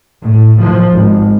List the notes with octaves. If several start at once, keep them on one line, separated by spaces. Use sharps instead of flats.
A2
F3
G#1